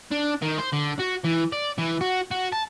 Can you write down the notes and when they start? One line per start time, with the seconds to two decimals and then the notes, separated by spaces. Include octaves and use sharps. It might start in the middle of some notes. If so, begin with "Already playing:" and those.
0.12 D4
0.42 D#3
0.58 C5
0.73 D3
1.00 F#4
1.25 E3
1.53 D5
1.78 E3
2.01 F#4
2.31 F#4
2.52 A5